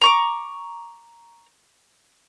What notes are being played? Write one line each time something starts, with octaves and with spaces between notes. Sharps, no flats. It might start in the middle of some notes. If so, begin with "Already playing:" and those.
A#5 C#6 D6